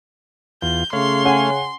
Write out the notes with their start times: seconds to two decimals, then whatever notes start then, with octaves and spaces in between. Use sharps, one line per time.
0.62 E2 F4 G6
0.93 C#3 A3 C#5 F5 C6
1.25 C#4 F#5 G#5